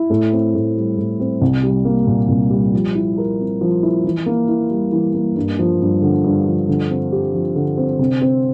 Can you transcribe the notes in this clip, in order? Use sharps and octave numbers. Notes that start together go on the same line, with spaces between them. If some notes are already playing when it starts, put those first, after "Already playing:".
Already playing: E4
A2
C4
A2
G3
A2
C4
C2
G3
A#3
A#2
C2
G3
F3
E4
A#4
C4
F3
E4
E3
A#3
E4
G3
E3
A#3
G2
F3
G2
D3
G2
F3
D3
C4
G4
F3
D3
C4
C3
C4